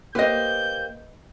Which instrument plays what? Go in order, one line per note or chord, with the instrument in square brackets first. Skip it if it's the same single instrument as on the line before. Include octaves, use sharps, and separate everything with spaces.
[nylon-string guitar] A#3 G4 C5 [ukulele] B4 D#5 [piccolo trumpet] G6